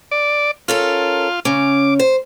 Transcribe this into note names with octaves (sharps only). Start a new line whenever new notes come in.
D5
C#4 F4 A4 A#4
C#3 C#4 D6
C5